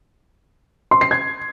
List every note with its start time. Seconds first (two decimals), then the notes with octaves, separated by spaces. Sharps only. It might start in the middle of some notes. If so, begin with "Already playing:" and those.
0.91 C6
1.01 C7
1.11 G#6